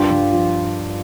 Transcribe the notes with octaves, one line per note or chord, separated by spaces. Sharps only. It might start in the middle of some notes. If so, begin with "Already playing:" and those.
Already playing: G2 F4 G4
G2
F3